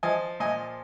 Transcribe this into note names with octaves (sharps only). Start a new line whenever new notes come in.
F3 D#5 G#5
A#2 D#5 G#5